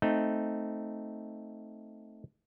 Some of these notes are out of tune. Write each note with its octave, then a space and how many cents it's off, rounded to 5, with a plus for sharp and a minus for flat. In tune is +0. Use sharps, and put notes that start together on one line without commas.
A3 +0 C4 +0 D#4 +0